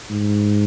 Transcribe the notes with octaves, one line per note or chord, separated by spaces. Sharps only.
G#2